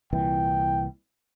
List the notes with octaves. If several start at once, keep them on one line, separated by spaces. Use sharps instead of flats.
C2 A#2 E3 G5